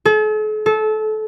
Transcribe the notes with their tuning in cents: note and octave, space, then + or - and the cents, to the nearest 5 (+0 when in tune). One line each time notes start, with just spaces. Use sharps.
A4 -45
A4 -25